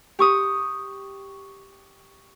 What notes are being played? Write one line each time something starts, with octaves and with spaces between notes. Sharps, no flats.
G4 C#6 D#6